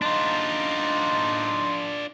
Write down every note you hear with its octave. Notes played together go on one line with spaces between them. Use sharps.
D4 D#4 F4 C6